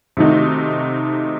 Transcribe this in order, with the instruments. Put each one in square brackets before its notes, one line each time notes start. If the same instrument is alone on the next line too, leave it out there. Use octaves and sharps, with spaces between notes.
[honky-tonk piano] C3 D#3 A3 D#4 F#4